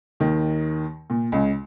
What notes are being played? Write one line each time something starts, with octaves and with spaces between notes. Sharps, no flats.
D#2 D#3
A#2
C#2 C#3